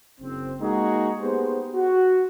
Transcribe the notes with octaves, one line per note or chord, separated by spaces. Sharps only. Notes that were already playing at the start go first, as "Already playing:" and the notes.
F#1 C4
G#3 A#3 D#4 F#4 G#4 A#5
B3 G4 G#4 C5
F#4